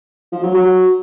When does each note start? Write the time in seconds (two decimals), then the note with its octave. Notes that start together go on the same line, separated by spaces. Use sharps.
0.32 F3
0.44 F#3
0.55 F#3